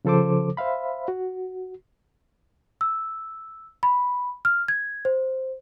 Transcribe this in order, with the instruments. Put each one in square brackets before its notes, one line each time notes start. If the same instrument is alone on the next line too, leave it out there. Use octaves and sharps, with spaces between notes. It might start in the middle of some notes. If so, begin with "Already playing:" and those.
[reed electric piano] C#3 F3 A4 C5 D6
C5 E5 F5 B5
F#4
[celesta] E6
B5
F6
G#6
C5